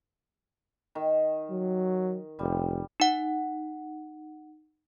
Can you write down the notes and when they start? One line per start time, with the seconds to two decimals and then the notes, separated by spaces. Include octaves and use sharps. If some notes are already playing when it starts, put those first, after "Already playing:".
0.95 D#3
1.51 F#3
2.39 F1 G3
3.00 D#4 F#5